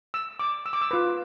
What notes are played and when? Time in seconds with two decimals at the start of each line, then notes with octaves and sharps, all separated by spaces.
0.14 E6
0.39 D6
0.66 E6
0.73 D6
0.81 E6
0.91 F4 B4 D6